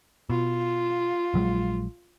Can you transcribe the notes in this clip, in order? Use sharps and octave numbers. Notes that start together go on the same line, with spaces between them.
B2 F4
A#1 F#3 G#3